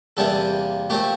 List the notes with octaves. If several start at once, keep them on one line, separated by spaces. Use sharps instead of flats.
E2 C3 G3 A#3 A4
A#2 A3 C4 G4